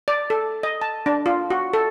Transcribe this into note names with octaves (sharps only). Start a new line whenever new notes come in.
D5
A4
D#5
A5
D4
F4
F#4
A4